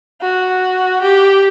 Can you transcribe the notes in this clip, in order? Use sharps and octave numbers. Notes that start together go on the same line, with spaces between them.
F#4
G4